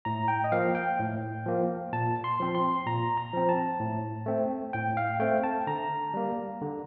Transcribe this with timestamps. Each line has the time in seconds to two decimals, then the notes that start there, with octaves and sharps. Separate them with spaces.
0.05 A2 A#5
0.28 G5
0.44 D#5
0.52 F3 A#3 F5
0.75 G5
0.99 A2
1.46 F3 A#3
1.93 A#2 A5
2.24 C6
2.40 F3 C4
2.55 C6
2.86 A#2 A#5
3.17 A#5
3.33 F3 C4
3.49 A5
3.80 A2
4.26 A3 C4
4.73 A2 G5
4.97 F5
5.20 A3 C4 G5
5.44 A5
5.67 D3 A#5
6.14 G3 A#3
6.61 D3